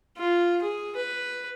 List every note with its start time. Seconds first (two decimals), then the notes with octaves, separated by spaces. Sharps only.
0.17 F4
0.62 G#4
0.96 B4